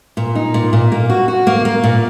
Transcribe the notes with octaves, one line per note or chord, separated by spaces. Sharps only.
A#2
D#4
A#2
A#2
A#3
F#4
F#4
A#3
A#3
A#2